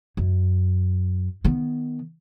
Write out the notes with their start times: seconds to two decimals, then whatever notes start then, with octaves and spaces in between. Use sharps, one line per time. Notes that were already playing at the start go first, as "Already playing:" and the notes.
0.17 F#2
1.44 D#3 B3